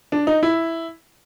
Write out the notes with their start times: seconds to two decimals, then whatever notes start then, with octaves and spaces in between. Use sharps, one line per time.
0.12 D4
0.27 D#4
0.43 E4